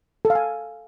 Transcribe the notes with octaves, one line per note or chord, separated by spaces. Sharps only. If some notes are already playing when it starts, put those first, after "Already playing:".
A4
F5
G#5